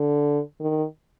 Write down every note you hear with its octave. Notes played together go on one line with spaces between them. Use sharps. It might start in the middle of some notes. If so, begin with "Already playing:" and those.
Already playing: D3
D#3